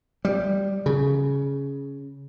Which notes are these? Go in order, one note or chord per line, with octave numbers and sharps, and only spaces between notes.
G3
C#3